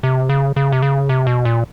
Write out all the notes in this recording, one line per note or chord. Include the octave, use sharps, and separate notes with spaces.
C3
C#3
C#3
C3
C#3
C3
B2
A#2